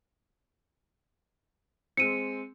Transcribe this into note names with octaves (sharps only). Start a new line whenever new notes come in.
G#3 C4 C#7 D#7